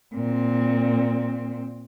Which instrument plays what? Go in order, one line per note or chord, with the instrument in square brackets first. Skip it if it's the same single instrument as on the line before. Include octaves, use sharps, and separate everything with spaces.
[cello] A#2 C4